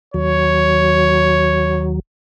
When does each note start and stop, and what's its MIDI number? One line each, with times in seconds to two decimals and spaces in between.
0.14 1.99 39
0.14 1.99 54
0.14 1.89 73